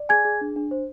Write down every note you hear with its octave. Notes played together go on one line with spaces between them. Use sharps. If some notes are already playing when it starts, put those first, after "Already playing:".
Already playing: D5
G#4 G#5 G#6
G#4
D4
D4
C5